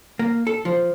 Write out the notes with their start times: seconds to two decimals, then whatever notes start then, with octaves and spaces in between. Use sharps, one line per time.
0.19 A#3
0.47 A4
0.65 F3